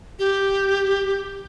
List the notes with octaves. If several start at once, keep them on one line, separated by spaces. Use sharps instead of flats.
G4